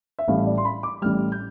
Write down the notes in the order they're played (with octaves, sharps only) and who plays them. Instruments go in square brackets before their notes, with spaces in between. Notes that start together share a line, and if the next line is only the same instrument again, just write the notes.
[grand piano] E5
A1 A2 G3 F5
D5
C6
B5
D6
A1 A2 G3 F6
G6